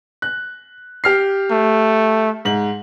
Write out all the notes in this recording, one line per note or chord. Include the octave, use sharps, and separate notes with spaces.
F#6
G4 F6 C7
A3
G#2 F#7